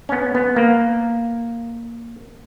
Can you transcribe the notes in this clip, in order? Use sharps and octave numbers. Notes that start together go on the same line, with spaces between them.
C#4
B3
B3
A#3